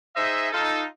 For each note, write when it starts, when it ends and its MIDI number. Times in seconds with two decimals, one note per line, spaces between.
0.15 0.48 63
0.15 0.48 68
0.15 0.48 72
0.15 0.48 75
0.15 0.48 76
0.52 0.84 63
0.52 0.84 65
0.52 0.84 69